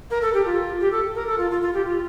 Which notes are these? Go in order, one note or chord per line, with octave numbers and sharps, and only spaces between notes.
A#4
A4
G4
F4
G4
A4
A#4
A4
F4
F4
F4
G4
F4